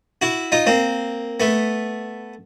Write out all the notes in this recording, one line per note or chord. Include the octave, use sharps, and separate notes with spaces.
E4 F#4
D#4 F4
A#3 C4
A3 B3